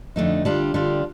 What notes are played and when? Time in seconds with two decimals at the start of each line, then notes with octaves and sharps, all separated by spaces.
0.16 F2 D3 A3 D#4
0.45 D3 G3 D4 F4
0.74 D3 G3 D4 F4